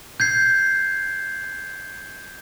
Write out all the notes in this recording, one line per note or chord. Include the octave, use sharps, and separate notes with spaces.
G6 G#6 C7